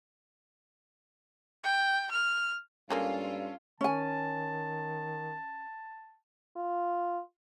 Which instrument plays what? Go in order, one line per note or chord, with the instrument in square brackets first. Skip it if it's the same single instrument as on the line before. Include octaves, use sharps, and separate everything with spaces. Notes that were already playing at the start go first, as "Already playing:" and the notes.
[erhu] G5
F6
[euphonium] G2 [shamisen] G#3 A#3 G#4 [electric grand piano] C#4 A4 [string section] F4
[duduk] D#3 [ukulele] C#4 G#5 [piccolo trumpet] A5
[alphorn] F4